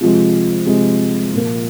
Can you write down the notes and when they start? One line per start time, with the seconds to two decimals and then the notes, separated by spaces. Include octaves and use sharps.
0.01 C3 F3 G#3
0.66 C3 F3 G#3
1.32 A#2 F3 A#3